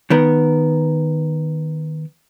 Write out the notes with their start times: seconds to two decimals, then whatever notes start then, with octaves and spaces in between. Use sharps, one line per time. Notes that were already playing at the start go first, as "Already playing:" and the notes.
0.10 D#3 B3 A#4